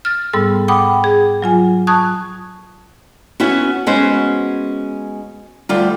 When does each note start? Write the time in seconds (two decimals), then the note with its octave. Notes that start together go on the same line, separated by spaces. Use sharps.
0.05 F6 A6
0.33 G#2 G3 B3 A4 E6
0.68 F#5 G5 B5 D6 D#6
1.04 G#4
1.42 F#3 F4 G#5
1.87 A5 C#6 D#6 F#6 G#6
3.40 B3 C#4 E4 F#4
3.86 G#3 B3 C#4 F#4 C5
5.69 D2 G3 F4